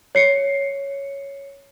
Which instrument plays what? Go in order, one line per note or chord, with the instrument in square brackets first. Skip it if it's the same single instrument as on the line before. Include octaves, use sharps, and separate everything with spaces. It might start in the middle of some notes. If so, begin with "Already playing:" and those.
[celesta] C#5 C7 C#7